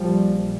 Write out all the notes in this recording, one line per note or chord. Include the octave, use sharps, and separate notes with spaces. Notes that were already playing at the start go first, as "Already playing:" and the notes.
Already playing: A#1 A#2 F3 G3